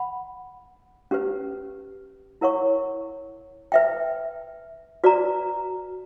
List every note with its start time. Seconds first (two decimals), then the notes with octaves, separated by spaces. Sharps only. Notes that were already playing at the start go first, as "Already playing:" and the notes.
Already playing: F#5 B5
1.11 C#4 G4 B4
2.41 E4 A#4 C#5 F#5 C#6
3.72 B4 E5 G5
5.04 F#4 B4 D5 A#5